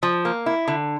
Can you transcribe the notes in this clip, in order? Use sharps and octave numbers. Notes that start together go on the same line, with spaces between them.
F3
A#3
E4
D3